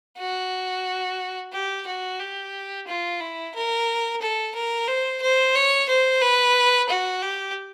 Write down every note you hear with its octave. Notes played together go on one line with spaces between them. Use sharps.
F#4
G4
F#4
G4
F4
E4
A#4
A4
A#4
C5
C5
C#5
C5
B4
F#4
G4